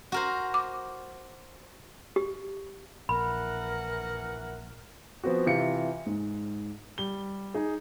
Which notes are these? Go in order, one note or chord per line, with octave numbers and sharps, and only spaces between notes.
F#4 A#4 C5
D6
G4
A#1 E3 A#4 F#5 B5
F3 B3 C4 F#4
C3 E3 F4 C#7
G#2
G3 G7
D#4 G#4